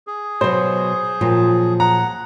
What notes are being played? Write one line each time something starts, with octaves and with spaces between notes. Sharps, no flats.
G#4
B2 F#3 C5
A#2 F3 F#3
F#5 A#5